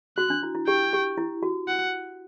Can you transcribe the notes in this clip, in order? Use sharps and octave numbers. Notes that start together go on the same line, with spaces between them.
F#4 F#6
D4
E4
E4
G4 G5
G4
E4
F#4
F#5